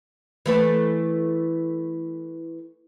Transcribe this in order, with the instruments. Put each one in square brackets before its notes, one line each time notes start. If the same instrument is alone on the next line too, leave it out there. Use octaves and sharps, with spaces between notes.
[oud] E3 A3 B4